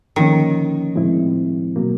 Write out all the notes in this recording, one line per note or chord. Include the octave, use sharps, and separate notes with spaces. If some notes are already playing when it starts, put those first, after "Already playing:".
D3 D#3 F3 A#3 C#4
A2 F3 G#3 C4 E4
B2 F#3 A#3